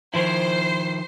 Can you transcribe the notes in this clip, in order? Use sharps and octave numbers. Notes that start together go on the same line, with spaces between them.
D#3 F3 E4 C5 C7